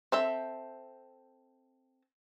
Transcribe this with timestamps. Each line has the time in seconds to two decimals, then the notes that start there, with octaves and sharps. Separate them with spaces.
0.12 C4 A4 E5